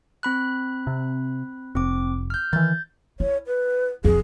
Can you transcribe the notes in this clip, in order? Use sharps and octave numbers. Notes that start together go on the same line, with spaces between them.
C4 B5 F#6
C3
F1 C4 D6
F6 G6
D#3 E3 G6 A6
E4 C#5
B4
F1 F2 G#4